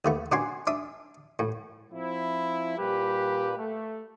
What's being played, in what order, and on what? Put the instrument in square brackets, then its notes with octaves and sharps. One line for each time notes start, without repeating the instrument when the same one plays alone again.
[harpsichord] D#2 A3 B3
B2 C#4 D4 F#5 G#5 C6
D4 E5 D#6
A2
[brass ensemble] F3 C4 E4
A#2 G3 G4 B4
A3